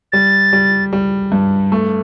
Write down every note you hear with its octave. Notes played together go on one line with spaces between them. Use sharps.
G3 A6
G3
G3
G2
A3